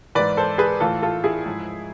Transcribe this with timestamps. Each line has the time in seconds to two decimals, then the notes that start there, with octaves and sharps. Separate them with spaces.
0.15 G#2 E3 B4 D5
0.37 A4 C5
0.58 G#4 B4
0.80 A2 E3 F4 A4
1.02 F4 A4
1.24 E4 G#4
1.46 G#2 F3